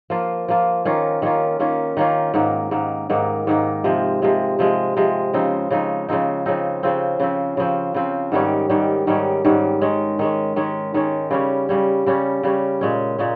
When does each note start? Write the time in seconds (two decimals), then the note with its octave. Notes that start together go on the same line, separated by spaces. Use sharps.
0.10 F3 A#3 F4
0.48 F3 A#3 F4
0.85 D#3 A#3 C#4 F4
1.22 D#3 A#3 C#4 F4
1.60 D#3 A#3 C#4 F4
1.97 D#3 A#3 C#4 F4
2.34 G#2 D#3 A#3
2.71 G#2 D#3 A#3
3.10 G#2 D#3 A#3
3.47 G#2 D#3 A#3
3.84 C3 F3 G#3
4.22 C3 F3 G#3
4.59 C3 F3 G#3
4.97 C3 F3 G#3
5.34 C#3 F3 C4 D#4
5.71 C#3 F3 C4 D#4
6.09 C#3 F3 C4 D#4
6.46 C#3 F3 C4 D#4
6.83 C#3 F3 C4
7.20 C#3 F3 C4
7.57 C#3 F3 C4
7.94 C#3 F3 C4
8.32 G#2 D#3 G3 C#4
8.69 G#2 D#3 G3 C#4
9.07 G#2 D#3 G3 C#4
9.45 G#2 D#3 G3 C#4
9.82 D#3 G#3 C#4
10.19 D#3 G#3 C#4
10.56 D#3 G#3 C#4
10.94 D#3 G#3 C#4
11.31 C#3 G3 C#4
11.69 C#3 G3 C#4
12.06 C#3 G3 C#4
12.43 C#3 G3 C#4
12.81 A#2 G#3 C#4
13.19 A#2 G#3 C#4